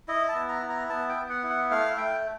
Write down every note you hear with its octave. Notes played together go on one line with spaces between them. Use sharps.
E4 D#5
A5
B3
A#5
E4
A#5
B3 A5
G5
B3
F#5
E4
F#5
A3 F5
A3 G5